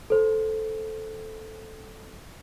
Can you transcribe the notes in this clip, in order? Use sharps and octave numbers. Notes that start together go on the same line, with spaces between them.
A4 C5